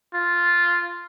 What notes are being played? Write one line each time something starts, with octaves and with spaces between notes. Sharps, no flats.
F4